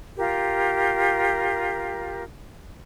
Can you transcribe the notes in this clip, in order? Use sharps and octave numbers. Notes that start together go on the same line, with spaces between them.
F4 G4 A#4